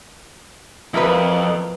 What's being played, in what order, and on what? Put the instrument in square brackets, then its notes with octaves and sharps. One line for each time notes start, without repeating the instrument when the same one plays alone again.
[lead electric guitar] F2 [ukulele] E4 A#4 B4